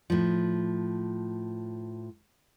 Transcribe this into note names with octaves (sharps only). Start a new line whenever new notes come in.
A2 F3